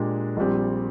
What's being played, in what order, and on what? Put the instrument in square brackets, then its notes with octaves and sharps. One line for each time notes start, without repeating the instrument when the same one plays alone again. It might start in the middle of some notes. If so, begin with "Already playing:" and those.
Already playing: [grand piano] A#2 G#3 D4 G4
A#1 A#2 G3 C4